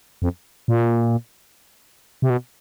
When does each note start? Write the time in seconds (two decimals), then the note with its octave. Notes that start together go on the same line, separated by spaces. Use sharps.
0.22 F2
0.68 A#2
2.22 C3
2.30 B2